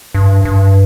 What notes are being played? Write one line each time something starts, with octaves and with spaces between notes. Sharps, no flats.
G2
G2